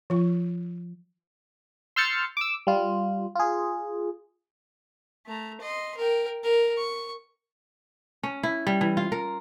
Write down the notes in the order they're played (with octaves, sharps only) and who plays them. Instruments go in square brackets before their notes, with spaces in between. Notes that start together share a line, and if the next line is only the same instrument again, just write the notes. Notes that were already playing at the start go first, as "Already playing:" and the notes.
[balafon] F3 F4
[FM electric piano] C6 E6 F6 G6 A6 C#7
D6 E6
G3 F4
F4 G#4
[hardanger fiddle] A3 A#5
D#5 C6
A#4 G5
A#4
C#6
[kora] C#4
E4
G3
E3
F4
A#4